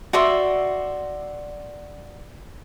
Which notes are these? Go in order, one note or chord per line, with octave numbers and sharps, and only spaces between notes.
F#4 D5 E5 C6